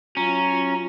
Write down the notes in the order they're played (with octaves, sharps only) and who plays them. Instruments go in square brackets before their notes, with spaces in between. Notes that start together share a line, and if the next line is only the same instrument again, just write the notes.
[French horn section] F#3 F4 [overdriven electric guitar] C#4 [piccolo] A#5